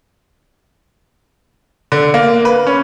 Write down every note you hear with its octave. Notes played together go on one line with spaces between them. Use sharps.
D3
A#3
B4
C#4